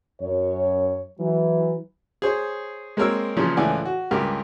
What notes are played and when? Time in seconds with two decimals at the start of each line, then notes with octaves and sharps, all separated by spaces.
0.21 F#2 C#5
1.19 E3 F#3
2.22 G#4 C5 C#5
2.97 G#3 A#3 C4 A#4 C#5 E6
3.37 A#2 C#3 E3 F3 C#4
3.57 C#2 A2 E3 D5 G#5
3.85 F#4
4.11 C#2 G2 G4 A#4